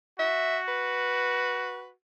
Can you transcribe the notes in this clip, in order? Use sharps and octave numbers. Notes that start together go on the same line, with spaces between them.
F#4 E5
B4